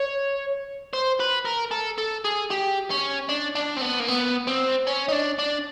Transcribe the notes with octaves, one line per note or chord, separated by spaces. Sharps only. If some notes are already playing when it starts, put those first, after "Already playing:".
Already playing: C#5
C5
B4
A#4
A4
A4
G#4
G4
C#4
D4
D4
C4
B3
A#3
B3
C4
C#4
D#4
D4
D4